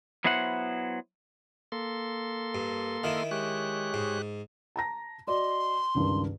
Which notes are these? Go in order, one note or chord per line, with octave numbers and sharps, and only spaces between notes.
F#3 B3 E4 C5 F#5
A#3 A4 C6
G2
D#3 E4 E5 F5 D#6
G#3 G4 C#5 F#6
G#2
A5 A#5 A#6
F#4 D5 D#5 C6
C#2 G2 D#3